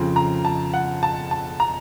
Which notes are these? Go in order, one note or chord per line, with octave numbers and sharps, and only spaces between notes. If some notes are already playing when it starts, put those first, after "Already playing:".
Already playing: F2 C#3 F3 C4
A#5
A5
F#5
A5
A5
A#5